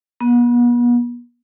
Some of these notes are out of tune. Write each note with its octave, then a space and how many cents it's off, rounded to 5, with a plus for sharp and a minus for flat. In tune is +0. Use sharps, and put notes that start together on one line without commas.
B3 -40